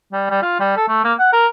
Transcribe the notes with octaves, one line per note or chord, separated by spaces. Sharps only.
G3
G3
F4
G3
A4
A3
A#3
F#5
A#4